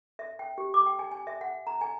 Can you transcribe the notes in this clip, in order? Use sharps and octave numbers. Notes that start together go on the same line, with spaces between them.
E5
G5
G4
D6
G5
G#5
G#5
E5
F#5
A#5
G#5